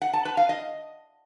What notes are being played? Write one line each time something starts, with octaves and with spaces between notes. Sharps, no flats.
F#5
A5
B4
F5
D#5